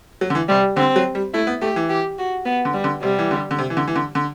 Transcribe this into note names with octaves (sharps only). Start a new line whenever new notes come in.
F#3
D3
E3
C3 G3
D3 C4
F#3
G3
A3 E4
B3
A3 G4
E3
G4
F#4
B3
D3
G3
D3
C3 G3
E3
D3
D3
C3
E3
D3
E3
D3
D3